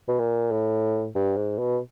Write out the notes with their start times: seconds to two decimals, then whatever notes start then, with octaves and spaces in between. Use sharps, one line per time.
0.08 B2
0.19 A#2
0.51 A2
1.15 G2
1.37 G#2
1.59 B2